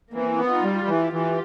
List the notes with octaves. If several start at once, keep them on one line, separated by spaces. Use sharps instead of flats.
E3 A#3 C4
B3
D#4 F4
G3
E3 F4 G4
E3